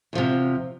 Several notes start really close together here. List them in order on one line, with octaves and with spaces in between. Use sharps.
E2 F3 C3